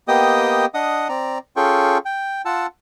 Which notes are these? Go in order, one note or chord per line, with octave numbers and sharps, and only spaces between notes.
A#3 B3 G4 D#5 G5 D#6
D4 D#5 F#5 D#6
C4 D5 A#5
C#4 F4 G#4 A4 G5 C#6
G5
F4 F#5 A5 E6